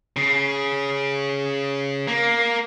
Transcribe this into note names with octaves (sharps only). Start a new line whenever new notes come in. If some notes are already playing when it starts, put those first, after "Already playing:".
C#3
A#3